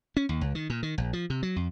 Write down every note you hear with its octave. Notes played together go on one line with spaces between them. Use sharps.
C#4
D#2
C#2
D#3
A#2
D#3
A#1
F3
C3
F#3
F2